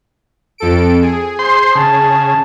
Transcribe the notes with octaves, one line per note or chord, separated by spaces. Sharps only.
F2 A4 D7
G#4
C5 C6
C#3 A5